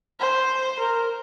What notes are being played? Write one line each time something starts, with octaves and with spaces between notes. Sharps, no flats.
C5
A#4